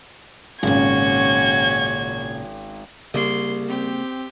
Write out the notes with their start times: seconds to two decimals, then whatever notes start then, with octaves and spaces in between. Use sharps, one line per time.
0.63 G#1 A#2 C#3 C#4 F#4 G#6
3.14 C2 C#3 A#3 C6
3.68 C4 G4